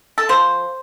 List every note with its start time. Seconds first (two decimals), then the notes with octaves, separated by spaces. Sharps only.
0.18 A4
0.29 F3 C5